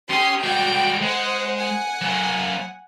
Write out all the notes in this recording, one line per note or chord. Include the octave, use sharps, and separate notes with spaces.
C#4 G4 G#5 C6 D#6
G3 G#3 F#4 G5 D7
G#3 C5 F#5
F#5 G#5
F#3 A#3